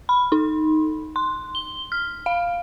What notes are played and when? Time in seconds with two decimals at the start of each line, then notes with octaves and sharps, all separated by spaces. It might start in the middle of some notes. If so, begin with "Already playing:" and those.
0.09 B5
0.32 D#4
1.16 C6
1.55 G7
1.92 F6
2.26 F5